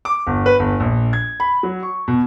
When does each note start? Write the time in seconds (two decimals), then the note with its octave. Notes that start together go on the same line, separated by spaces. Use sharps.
0.05 D6
0.27 G1
0.46 B4
0.59 G1
0.80 A#1
1.13 G#6
1.40 B5
1.63 F#3
1.83 C#6
2.08 B2